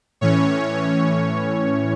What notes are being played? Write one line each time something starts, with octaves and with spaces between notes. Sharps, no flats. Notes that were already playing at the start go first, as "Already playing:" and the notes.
A2 E3 C#4 C#5